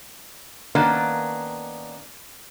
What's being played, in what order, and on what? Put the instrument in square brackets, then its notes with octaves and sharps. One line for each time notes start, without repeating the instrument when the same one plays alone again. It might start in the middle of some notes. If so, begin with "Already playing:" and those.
[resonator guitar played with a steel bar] D#3 A#3 B3 C#4 D4